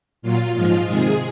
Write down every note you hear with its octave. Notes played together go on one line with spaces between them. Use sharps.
A#2 F#3 F4
G#2 F3 G#3 F4
C3 D#3 G#3 G#4